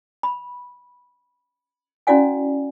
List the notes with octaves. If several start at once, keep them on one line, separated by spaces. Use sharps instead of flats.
B5
C#4 E4 F#4 D5 F#5 G#5